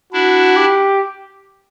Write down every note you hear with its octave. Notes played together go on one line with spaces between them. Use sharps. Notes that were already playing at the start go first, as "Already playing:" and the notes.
D4 E4 F#4
G4